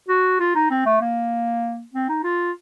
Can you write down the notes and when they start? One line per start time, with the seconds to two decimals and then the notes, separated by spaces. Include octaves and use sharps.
0.09 F#4
0.40 F4
0.55 D#4
0.71 C4
0.86 A3
1.01 A#3
1.93 C4
2.09 D#4
2.24 F4